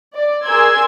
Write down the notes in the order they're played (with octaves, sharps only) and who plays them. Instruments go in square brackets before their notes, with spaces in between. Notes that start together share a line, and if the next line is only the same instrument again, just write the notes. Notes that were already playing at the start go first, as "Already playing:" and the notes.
[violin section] D5
G#4 A#4 D5 C6 E6 G#6